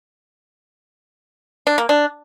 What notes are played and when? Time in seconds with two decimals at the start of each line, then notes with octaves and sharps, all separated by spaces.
1.67 D4
1.78 A#3
1.89 D4